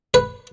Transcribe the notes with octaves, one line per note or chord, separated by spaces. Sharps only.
B4